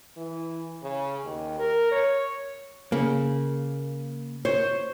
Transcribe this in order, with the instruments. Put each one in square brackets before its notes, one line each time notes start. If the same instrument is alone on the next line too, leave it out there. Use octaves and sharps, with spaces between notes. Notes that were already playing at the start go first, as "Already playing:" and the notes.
[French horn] E3
C#3
D#2
A#4
C#5
[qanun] C#3 [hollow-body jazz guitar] A#3
[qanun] C5 [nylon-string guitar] C#5